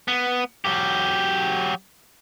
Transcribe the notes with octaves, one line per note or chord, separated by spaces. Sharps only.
B3
F#3 G4